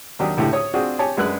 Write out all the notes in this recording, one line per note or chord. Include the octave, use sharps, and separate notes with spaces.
D#2 F#3 D4 G4 D5 D#6
C#2 A2 D3 G4
C#5 D#6
C4 D4 F4 F#4 G#4
G4 C#5 G#5 A5
F#2 G#3 D4 B4 F#6